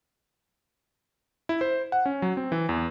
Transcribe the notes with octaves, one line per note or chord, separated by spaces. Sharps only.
E4
C5
F#5
C#4
F#3
C4
E3
E2